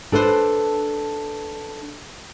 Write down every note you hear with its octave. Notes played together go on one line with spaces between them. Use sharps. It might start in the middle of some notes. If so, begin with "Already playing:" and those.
D4 A4 B4 C5